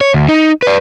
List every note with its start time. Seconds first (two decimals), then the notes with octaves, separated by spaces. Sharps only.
0.01 C#5
0.14 D2
0.29 D#4
0.62 B4 D5